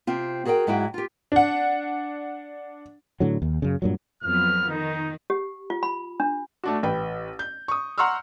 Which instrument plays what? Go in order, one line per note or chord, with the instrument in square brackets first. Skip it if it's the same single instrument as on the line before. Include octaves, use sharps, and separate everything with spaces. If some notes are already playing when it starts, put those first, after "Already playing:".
[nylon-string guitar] C3 C4 F4
F#4 G#4 A#4 D#5 G5
G#2 F#3 G#3 E4 F#4 G5
F4 G4
[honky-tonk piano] D4 F#5
[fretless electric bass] A2 D3 F#3
D#2
F#2 C#3
G2 A#2 F#3
[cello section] F2 F#3 B3 [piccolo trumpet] F6
[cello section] D#3 [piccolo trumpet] D#4
[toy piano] G4
F4
B5
D4
[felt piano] A3 D4 F#4
A1 B4 G5
G6
C#6 D#6
F#5 A#5 C6 C#6 E6 F6